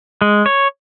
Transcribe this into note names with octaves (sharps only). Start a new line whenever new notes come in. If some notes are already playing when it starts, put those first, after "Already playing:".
G#3
C#5